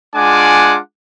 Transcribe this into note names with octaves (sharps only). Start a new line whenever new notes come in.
G#3 D4 F4 F#5 G#5 D6